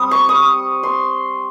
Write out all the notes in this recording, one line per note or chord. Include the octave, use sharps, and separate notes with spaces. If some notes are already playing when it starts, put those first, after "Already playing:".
Already playing: G3 C4 D#6
C#6
D#6
C6